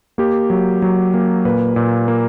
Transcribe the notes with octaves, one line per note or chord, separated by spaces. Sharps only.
A#3 G4
F#3
F#3
A#3
A#2 B4
A#2
A#3